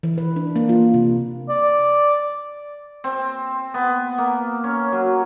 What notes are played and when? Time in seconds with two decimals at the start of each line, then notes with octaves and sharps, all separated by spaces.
0.03 E3
0.18 B4
0.36 D4
0.56 A#3
0.69 F4
0.94 C3
1.49 D5
3.04 C4
3.74 B3
4.18 A#3
4.64 C#4
4.92 F#3